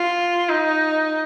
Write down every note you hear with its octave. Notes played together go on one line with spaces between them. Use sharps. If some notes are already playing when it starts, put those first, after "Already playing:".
Already playing: F4
D#4